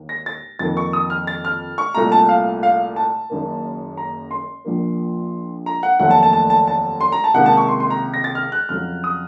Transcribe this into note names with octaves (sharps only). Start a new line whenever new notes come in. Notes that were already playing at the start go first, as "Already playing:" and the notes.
Already playing: D#2 D#3
A#6
A6
F2 D#3 A#3 A6
C#6
D#6
F6
A6
F6
C#6
C2 A#2 A3 A#5
A5
F5
F5
A5
F#1 F#2 D#3 A#3
A#5
C6
A#1 A#2 F3 A#3
A#5
F#5
F1 D#2 D#3 F#3 A3 F#5
A5
A5
A5
A5
A5
C6
A#5
A5
C#2 C3 D#3 A#3 F#5
A5
C#6
C6
C6
A#5
A#6
A6
F6
F#6
F2 C#3 F#3 F6
D#6